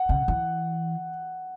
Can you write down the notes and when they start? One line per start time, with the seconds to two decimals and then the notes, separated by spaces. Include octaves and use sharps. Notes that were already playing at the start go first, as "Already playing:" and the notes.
Already playing: F#5
0.09 C#3
0.28 E3